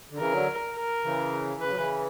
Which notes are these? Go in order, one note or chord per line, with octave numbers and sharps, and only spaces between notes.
D3
C#3 E3 A#4
D3 F#3
A#4
C#3 E3
C#3 B4
F#3
C#3 E3